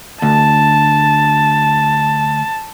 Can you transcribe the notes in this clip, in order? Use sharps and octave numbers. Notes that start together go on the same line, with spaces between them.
D2 A5